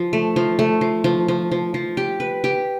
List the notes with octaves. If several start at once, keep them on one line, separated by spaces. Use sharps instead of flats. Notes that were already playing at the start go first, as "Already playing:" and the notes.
Already playing: F3
A3
F3
A3
F3
F3
F3
F3
F3
G4
B4
G4